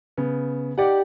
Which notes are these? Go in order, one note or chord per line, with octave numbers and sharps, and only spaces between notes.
C#3 B3
D#4 G4 D5 F#5